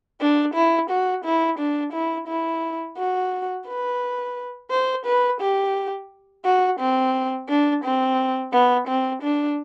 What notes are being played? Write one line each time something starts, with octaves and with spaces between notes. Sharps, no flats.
D4
E4
F#4
E4
D4
E4
E4
F#4
B4
C5
B4
G4
F#4
C4
D4
C4
B3
C4
D4